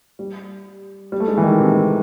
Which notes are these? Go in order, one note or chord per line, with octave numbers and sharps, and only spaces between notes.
G3
G3
A3
G#3
E3
D#3
C3
C3